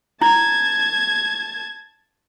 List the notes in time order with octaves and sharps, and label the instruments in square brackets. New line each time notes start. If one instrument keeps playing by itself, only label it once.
[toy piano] E4 [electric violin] A5 G#6